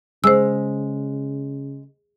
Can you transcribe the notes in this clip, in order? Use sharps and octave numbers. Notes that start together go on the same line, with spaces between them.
C#3 G#3 C5 E6